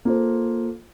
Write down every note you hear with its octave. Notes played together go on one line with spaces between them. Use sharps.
A#3 F4 A4 C5